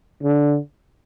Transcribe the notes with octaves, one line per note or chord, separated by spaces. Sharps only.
D3